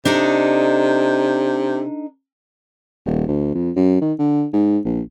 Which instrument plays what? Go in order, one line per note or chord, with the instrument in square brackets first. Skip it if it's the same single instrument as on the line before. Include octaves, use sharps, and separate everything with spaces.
[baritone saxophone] C3 [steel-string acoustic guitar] D4 D#4 A4
[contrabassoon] D#1
D2
F2
F#2
D#3
D3
G#2
A#1